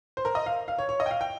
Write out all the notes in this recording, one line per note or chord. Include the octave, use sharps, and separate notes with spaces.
C5
A#4
D#5
F5
F5
C#5
C#5
D#5
G5
F5
G5